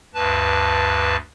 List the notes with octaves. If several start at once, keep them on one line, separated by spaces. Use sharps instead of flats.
D2 G2 B4 A5